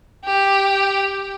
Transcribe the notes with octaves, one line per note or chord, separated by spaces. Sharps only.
G4